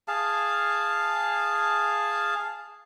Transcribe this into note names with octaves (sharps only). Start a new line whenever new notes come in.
G#4 F5 A5